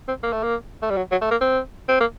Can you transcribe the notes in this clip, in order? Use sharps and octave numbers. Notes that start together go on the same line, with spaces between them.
C4
A#3
A3
A#3
A3
G3
F#3
F#3
A3
A#3
C4
C4
A#3